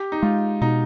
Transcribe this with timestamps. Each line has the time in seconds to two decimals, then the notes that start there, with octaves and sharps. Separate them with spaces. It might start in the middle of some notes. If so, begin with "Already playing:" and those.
Already playing: G4
0.12 D#4
0.22 G#3 F4
0.61 B2 D#4